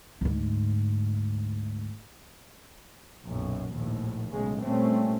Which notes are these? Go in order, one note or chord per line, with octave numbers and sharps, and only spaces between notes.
D2 G#2
B1 F#2 A#2
A#1 D#2 A2
B1 A2 C#3 G#3
A#2 G3 A3 C4 C#4